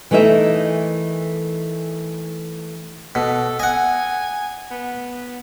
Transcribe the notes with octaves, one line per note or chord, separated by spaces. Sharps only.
E3 A3 D#4 A#4 E5
B2 A4
D#5 F#5 G#5
B3